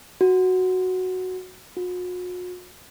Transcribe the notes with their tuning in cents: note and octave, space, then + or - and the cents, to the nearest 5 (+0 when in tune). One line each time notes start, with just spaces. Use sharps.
F#4 +0
F#4 -45